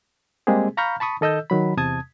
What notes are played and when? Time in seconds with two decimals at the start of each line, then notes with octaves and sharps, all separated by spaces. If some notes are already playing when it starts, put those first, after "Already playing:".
0.47 G3 G#3 A#3 C4 G4 G#4
0.77 F5 A#5 B5 C#6 F6 G6
1.00 A5 B5 C#6 D#6
1.21 D#3 A4 D#5 E6 G6
1.50 D#3 F#3 B5
1.77 E2 C3 A5 D#6 G#6